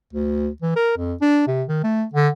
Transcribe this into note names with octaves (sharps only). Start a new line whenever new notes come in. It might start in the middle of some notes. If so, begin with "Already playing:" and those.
D2
E3
A#4
F2
D4
C3
D#3
A3
D3